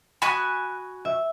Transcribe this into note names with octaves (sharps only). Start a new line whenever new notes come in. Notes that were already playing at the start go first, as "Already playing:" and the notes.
F#4 G#5 B5 D#6 F#6
E5